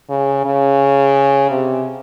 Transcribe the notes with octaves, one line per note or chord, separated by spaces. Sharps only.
C#3
C#3
C3